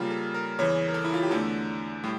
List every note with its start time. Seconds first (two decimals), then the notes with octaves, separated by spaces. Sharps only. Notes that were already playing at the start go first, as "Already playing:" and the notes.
Already playing: C#3 G3 A#3 F4
0.11 A4
0.34 A#4
0.59 E2 C#3 E3 C#5
0.88 A#4
0.94 A4
1.05 E4
1.14 F4
1.22 G4
1.31 E2 D3 A3 A4
2.04 A2 G3